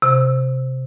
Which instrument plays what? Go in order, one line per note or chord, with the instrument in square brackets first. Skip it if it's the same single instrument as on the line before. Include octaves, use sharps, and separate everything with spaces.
[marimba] C3